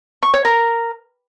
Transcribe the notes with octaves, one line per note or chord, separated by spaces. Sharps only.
C#6
C#5
A#4